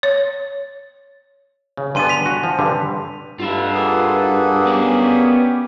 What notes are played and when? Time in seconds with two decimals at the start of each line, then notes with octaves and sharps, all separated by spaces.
0.03 C#5
1.77 C#3
1.95 G2 D3 B3 G#5 C6 D#7
2.09 B6 F7
2.26 F#4
2.43 F3
2.59 G2 D3 G3
3.39 G2 F4 A4 B4 E5 F#5
3.75 A#3 G#4
4.66 B3 C#4 G4 D5